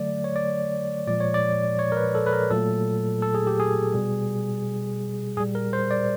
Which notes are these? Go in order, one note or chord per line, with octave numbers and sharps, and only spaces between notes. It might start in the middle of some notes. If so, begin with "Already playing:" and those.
Already playing: D3 F#3 A3 D5
C#5
D5
A#2 F3 G#3 D5
C#5
D5
C#5
A#4
B4
A4
B4
A#4
A#2 F#3 A3 A4
A4
G#4
G4
G#4
B2 G3
A#2 G3 G#4
A#4
C5
D5